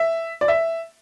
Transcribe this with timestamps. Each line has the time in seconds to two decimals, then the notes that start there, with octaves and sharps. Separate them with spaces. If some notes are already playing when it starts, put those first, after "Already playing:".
Already playing: E5
0.41 D5
0.48 E5